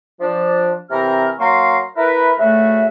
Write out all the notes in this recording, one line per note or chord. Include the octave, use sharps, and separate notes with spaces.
F3 D4
C3 E3 C4 A#4 A#5 F6
F#3 A#3 F5 A#5 C6 C#6
E4 A#4 B4
D2 C#3 A3 F#4 E5